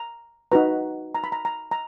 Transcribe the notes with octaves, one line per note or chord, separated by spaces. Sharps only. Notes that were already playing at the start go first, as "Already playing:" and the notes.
Already playing: A#5
D#4 F#4 B4 A#5
A#5
B5
A#5
A#5
A#5